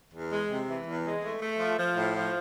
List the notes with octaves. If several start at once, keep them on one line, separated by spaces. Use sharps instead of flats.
E2
G#3
C3
E3
E2
G#3
A3
A3
F3
F3
A2
F3